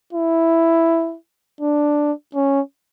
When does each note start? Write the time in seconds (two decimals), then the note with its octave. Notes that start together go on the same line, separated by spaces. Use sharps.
0.13 E4
1.61 D4
2.35 C#4